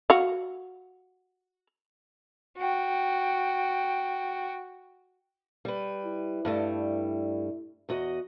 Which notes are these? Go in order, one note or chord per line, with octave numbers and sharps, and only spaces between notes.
F#4 F5
F#4 G5
G3 B4
E4
G2 G3 A3
E2 F#4 D#5